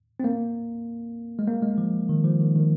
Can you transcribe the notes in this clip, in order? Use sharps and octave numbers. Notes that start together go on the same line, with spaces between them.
C4
A#3
G#3
A#3
G#3
F3
D#3
F3
D#3
D#3